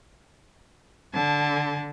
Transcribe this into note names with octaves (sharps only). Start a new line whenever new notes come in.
D3 A5